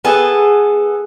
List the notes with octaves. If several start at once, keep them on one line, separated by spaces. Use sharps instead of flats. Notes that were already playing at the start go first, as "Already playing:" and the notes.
B3 G#4 A4